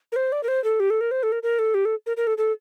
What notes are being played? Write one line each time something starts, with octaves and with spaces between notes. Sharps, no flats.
A#4
C5
D5
A#4
C5
A4
G4
A4
A#4
C5
A4
A#4
A#4
A4
G4
A4
A#4
A#4
A4
A4